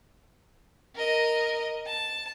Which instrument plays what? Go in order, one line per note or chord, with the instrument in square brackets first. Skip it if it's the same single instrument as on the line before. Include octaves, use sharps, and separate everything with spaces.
[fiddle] A#4 D#5
A5